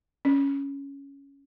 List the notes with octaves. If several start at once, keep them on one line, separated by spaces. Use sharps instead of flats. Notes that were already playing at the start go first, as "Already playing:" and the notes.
C#4